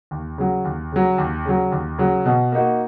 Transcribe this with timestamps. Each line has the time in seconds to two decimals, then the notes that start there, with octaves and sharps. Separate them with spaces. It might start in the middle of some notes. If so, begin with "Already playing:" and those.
0.11 D#2
0.38 C#3 F#3
0.65 D#2
0.92 C#3 F#3
1.18 D#2
1.45 C#3 F#3
1.72 D#2
1.98 C#3 F#3
2.26 B2
2.52 A#3 D#4 F#4